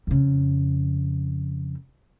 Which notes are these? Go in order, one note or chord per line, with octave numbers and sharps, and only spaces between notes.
F2 C#3